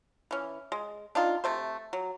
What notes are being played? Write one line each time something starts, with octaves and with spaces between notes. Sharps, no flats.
E3 C#4
G#3
D4 D#4 F4
C3 A3 C5
F#3